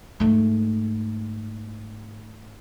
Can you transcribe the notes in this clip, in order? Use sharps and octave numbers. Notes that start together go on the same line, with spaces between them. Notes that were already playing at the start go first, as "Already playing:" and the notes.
G#2 A3